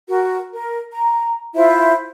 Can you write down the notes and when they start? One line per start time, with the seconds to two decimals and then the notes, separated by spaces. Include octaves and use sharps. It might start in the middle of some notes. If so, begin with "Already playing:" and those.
0.08 F#4 A#4
0.53 A#4
0.92 A#5
1.54 E4 F4 C5 E5